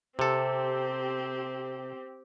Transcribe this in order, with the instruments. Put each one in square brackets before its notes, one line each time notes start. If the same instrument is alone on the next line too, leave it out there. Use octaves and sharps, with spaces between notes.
[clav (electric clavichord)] C3 A4 [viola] C4 G4